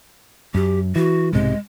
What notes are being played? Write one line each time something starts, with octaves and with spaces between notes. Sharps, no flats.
F#2 G4
E3 F#4
B1 G#2 C3 G#3